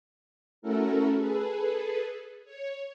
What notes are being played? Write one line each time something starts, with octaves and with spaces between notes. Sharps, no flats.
A3 C#4 E4 F#4 A4 A#4
G#4 A4 B4
C#5